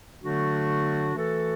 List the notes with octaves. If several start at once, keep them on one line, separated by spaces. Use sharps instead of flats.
D3 F#3 A3 D4 F#4
E3 A3 F#4 A4